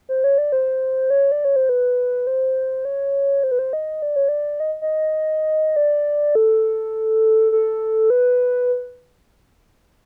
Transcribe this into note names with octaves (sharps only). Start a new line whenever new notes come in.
C5
C#5
D5
C5
C#5
D5
C#5
C5
B4
C5
C#5
C5
B4
C5
D#5
D5
C#5
D5
D#5
D#5
D5
A4
A4
B4